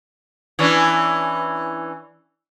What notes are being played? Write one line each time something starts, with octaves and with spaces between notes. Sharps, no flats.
E3 C#4 D4